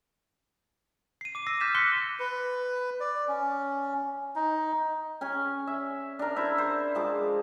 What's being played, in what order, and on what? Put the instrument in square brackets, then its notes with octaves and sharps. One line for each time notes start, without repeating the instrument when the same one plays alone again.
[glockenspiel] C7 D#7
D6 D#7
E6 A#6 C7
D6 F6 G6 A6 B6 E7
C6 F#6 A#6 B6 C#7 G7
[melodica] B4
D5
C#4
D#4
[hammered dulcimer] C#4 G#5
E5
D4 A#4
E4 C5 E5
C5
F3 G#3 D6